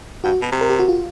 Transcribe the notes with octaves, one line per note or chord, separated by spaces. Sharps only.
G2 F#4
B2
C3
A#4
G4
F#4
F4